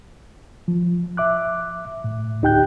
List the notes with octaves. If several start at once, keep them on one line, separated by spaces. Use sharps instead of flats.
F3
E5 D6 F#6
A2
D2 D#4 G4 G5 F#6 G6